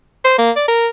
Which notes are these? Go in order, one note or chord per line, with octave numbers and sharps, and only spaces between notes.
C5
A#3
D5
A#4